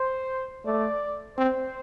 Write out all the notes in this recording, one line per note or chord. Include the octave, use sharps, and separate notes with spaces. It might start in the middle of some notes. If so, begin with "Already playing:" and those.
Already playing: C5
A3 D5
C4 C5